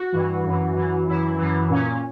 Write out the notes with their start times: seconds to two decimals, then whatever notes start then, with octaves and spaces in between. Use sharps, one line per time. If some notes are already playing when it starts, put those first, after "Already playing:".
Already playing: F#4
0.12 G2 E3
0.44 F#2 E3
0.75 F#2 E3
1.07 F#2 E3 E4
1.38 F#2 E3
1.69 A#2 C#4